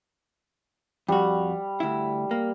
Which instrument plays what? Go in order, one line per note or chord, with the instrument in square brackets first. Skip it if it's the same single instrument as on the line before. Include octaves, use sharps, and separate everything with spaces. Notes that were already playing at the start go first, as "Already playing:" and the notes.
[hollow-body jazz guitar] F2 F#4 [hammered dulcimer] G3
[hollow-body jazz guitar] D2 E4
A#3